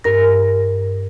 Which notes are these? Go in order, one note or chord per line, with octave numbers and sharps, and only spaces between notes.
G2 A#4 A#6